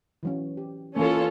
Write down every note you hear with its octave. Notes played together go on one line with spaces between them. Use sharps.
E3 F#3 C#4
G4
E3 A#3 C#4 F4 A4